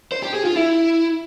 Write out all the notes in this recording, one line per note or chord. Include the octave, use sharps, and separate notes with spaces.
C5
G4
G#4
F4
E4